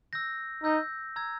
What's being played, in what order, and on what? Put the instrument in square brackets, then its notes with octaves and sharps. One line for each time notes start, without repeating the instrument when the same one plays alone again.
[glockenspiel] E6 G6 A#6
[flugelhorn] D#4 [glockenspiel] E6 G6 A#6
[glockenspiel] A#5 E6 G#6